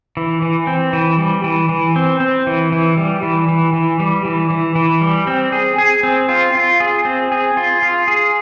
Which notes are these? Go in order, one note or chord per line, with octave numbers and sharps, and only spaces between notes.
E3
E3
C4
E3
G3
E3
E3
C4
C4
E3
E3
G3
E3
E3
E3
G3
E3
E3
E3
G3
C4
G#4
G#4
C4
F4
F4
G#4
C4
G#4
F4
F4
G#4